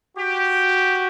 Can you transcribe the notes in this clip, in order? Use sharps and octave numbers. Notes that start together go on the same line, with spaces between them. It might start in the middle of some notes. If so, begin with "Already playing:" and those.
F#4 G4